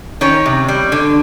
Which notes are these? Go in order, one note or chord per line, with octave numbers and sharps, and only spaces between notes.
D#3 C#4 C#5
C3
G3
D3